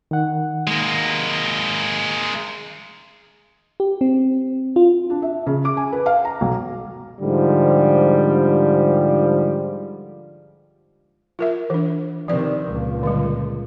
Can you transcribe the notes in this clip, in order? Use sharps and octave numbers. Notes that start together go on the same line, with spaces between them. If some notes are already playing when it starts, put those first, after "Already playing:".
D#3 F#5
G#3 A#3
G4
C4
F4
D4
E5
C#3
D6
G#5
B4
F5
A#5
B1
G#2 D3 F3 G3
F4 A#4 E5
E3 D4
C3 D#3 F3 D5
C#2 A#2
D3 G3